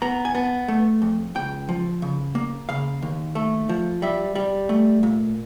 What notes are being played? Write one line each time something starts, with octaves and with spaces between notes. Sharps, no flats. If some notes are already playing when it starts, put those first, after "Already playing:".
B3 A#5
G#5
B3 A5
A3
F2
C#2 G5
F3
C#3
A#3
C#3 F5
D#2
A3
F3
G3 E5
G3
A3
A#2